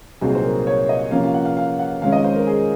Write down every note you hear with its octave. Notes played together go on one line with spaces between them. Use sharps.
C2 A#2 F#3 C4 D#4 G#4
C5
A#4
C#5
D#5
C3 F3 A#3 C#4 F5
F5
F#5
F5
F5
F#5
F2 D#3 G#3 C#4 F5
D#5
C5
A#4
G#4